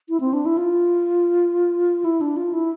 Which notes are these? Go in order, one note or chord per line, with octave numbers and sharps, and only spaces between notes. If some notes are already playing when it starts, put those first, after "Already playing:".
E4
C4
D4
E4
F4
E4
D4
F4
E4